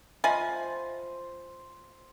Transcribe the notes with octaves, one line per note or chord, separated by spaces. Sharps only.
F3 C5 D#5 E5 G#5 B5